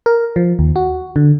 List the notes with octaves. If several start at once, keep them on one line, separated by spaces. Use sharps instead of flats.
A#4
F3
D#2
F#4
D3